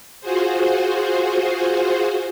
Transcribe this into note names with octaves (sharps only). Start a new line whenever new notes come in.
F4 F#4 G#4 C5